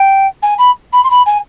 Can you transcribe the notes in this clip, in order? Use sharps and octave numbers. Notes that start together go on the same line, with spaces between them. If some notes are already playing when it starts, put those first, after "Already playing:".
Already playing: G5
G#5
B5
B5
C6
B5
G#5